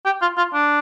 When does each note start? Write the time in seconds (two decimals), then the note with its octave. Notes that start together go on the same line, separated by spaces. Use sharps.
0.05 G4
0.22 F4
0.37 F4
0.54 D4